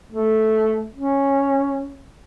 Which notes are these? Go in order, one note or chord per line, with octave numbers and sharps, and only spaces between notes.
A3
C#4